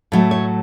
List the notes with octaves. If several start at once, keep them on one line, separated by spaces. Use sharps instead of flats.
A2 F#3 A3
C#5